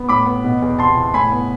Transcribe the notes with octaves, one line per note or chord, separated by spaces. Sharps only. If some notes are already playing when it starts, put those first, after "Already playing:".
Already playing: B3
A2 B5 D6
B3
B2
E2
C3 A5 C6
C2
A2 G#5 B5
B3